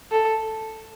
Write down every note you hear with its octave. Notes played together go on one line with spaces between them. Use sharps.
A4